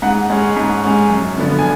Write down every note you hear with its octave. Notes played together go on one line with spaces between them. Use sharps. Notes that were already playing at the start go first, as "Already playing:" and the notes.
G#2 F#5
G#3 C#4
G#2
G#3 C#4
F#2
D3 F3 B3 D4
G#5